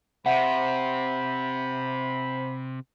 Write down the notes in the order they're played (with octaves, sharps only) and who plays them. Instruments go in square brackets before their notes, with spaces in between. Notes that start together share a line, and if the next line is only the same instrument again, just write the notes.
[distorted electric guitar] C3 [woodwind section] C5 B5 [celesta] E5 F#5